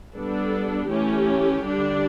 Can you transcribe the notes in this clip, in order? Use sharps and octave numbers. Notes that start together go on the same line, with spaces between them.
G3 B3 D4 A4
E3 A3 C#4 G4
D3 G3 D4